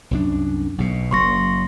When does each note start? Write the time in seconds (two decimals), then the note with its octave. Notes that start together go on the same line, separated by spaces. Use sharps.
0.11 C2 F#2 D4
0.78 B1 B2
1.11 F#1 F#3 A#3 C6 C#6 A#6